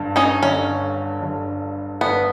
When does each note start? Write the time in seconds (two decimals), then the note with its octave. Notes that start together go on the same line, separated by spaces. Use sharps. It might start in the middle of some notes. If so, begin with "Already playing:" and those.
Already playing: G1 G2 D3
0.16 C#4 D#4
0.42 G1 G2 D3 C#4
1.21 G1 G2 D3
2.01 G1 G2 D3 B3